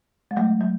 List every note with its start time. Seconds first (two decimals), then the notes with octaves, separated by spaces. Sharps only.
0.31 G#3
0.37 F#3 A3
0.61 F#3